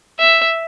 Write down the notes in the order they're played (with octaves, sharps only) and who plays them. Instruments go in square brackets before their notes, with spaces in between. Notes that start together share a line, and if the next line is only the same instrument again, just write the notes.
[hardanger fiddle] E5